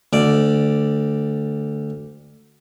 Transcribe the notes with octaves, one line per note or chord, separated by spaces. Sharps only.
D2 D5